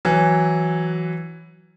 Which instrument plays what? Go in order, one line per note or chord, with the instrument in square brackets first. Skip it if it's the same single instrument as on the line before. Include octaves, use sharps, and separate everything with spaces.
[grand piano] E3 F#3